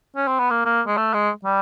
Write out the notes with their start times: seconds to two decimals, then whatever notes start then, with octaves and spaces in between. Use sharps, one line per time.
0.16 C#4
0.28 C4
0.39 B3
0.51 A#3
0.65 A#3
0.87 G#3
0.97 A3
1.14 G#3
1.45 G3